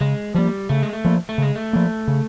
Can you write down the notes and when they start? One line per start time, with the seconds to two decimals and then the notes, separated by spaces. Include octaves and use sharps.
0.01 C#3 G#3
0.34 F3 G3 A#3
0.69 C#3 A3
0.83 G#3
0.93 A3
1.05 F3 A#3
1.29 A3
1.38 C#3 G#3
1.55 A3
1.73 F3 A#3
2.08 C#3